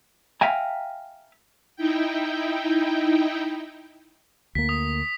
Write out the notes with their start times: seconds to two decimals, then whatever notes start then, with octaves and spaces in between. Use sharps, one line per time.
0.41 E5 F5 G5 G#5 A#5
1.76 D#4 E4 G5
4.55 D2 A#3 B6
4.69 D#6